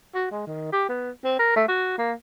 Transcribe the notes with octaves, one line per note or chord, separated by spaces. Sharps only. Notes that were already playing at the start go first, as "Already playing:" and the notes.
F#4
G#3
D#3
G4
B3
C4
A#4
A3
F#4
A#3